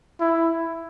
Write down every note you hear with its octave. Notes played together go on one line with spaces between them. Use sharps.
E4